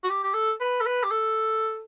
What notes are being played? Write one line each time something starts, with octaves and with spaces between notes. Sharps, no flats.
F#4
G4
G4
A4
B4
A4
B4
G4
A4